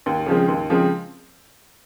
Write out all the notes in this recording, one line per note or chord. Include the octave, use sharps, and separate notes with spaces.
D#2
C#3 F3 G#3 C4
D#2
C#3 F3 G#3 C4